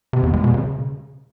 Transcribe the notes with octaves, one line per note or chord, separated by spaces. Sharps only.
C3
E2
G#3
B2
C#3